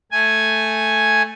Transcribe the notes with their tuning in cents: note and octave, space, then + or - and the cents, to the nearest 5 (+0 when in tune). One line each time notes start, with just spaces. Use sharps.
A3 +0 G#5 +0